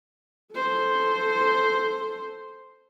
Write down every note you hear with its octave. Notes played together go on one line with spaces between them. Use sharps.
A4 C5